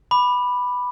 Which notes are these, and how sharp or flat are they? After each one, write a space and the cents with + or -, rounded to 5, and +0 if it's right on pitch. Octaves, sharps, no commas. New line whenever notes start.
B5 +0 D6 +20